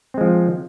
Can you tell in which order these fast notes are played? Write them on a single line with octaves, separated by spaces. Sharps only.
C4 G#3 F3